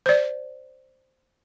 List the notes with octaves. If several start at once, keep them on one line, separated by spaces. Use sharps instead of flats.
C5 D5